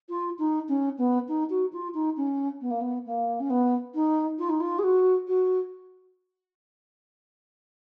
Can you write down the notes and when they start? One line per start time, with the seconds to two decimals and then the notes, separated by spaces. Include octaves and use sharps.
0.09 F4
0.39 D#4
0.68 C#4
0.98 B3
1.28 D#4
1.50 F#4
1.72 F4
1.94 D#4
2.17 C#4
2.61 B3
2.71 A#3
2.81 B3
3.06 A#3
3.40 C#4
3.50 B3
3.94 D#4
4.39 F4
4.49 D#4
4.60 F4
4.79 G#4
4.83 F#4
5.27 F#4